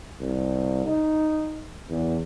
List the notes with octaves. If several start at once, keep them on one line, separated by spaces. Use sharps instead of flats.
C2
D#4
E2